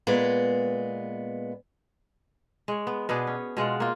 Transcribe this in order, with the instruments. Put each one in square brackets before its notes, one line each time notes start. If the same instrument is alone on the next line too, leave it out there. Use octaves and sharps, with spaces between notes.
[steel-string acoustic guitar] A#2 G#3 B3
[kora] G#3 C#5
B3
B2 B3 D4 G#4
C#4
B2 G#3 F4 F#5
A#3 F4